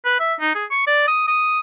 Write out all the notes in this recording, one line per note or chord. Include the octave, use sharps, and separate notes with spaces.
B4
E5
D#4
G#4
C#6
D5
D#6
D#6